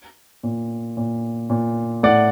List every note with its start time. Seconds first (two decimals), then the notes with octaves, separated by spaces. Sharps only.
0.43 A#2
0.97 A#2
1.50 A#2
2.03 A2 D5 F#5